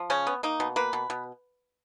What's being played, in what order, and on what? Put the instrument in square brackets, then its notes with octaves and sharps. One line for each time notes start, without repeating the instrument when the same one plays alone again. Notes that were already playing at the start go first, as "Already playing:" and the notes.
Already playing: [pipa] F3
C#3 C#4
B3
A#3 D#4
B2
A#3 B4
B2
B2